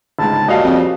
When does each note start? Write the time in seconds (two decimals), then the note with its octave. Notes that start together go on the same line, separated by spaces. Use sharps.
0.19 G1 C#2 G#2 A5
0.48 A#2 C#3 G3 F#4 D#5 F5 A5
0.64 F2